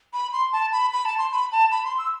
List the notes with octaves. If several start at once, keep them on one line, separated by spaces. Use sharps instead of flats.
B5
C6
A5
B5
B5
A5
C6
B5
A5
B5
C6
E6